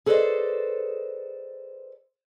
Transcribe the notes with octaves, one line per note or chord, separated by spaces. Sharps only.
G#4 A4 B4 C5 D5 D#5